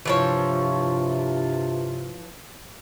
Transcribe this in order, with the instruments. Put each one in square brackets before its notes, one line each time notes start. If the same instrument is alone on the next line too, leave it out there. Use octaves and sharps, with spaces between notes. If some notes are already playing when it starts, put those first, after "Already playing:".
[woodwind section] G2 C3 F4 [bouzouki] E3 F3 C#5